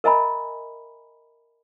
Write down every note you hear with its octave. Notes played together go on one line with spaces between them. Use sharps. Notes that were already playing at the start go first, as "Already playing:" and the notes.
A#4 D#5 E5 G#5 A#5 B5